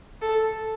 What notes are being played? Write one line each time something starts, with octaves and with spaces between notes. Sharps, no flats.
A4